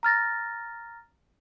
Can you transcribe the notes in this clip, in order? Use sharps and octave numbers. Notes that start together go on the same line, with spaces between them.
A#5 F6 A6 A#6